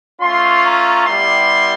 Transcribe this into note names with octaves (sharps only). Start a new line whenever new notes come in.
A3 C#4 F4 C6
A#5
G3 B3 E4 G4 C6